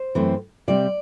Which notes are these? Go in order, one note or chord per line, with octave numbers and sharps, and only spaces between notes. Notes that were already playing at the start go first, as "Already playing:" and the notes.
Already playing: C5
F#2 E3 A3 C4
C3 G3 C4 D5